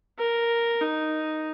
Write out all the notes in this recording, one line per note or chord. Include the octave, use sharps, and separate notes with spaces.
A#4
D#4